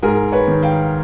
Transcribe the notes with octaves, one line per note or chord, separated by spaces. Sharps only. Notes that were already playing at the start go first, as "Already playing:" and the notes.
G#2 G#4 A#4
B4 C#5
D#3
F5 G5